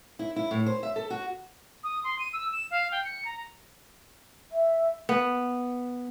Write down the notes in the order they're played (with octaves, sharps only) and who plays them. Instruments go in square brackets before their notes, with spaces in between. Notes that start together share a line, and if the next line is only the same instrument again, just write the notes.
[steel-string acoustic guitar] E4
E4
A2
C5
E5
A4
F#4
[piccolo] D#6
C6
D#7
E6
E7
F5
G5
C#7
A#5
[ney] E5
[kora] B3